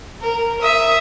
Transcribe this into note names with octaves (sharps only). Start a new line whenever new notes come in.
A#4
E5 D#6